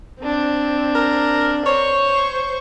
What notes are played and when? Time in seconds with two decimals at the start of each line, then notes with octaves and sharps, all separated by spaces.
0.21 C4 D4
0.95 A#4
1.66 C5 C#5 C#6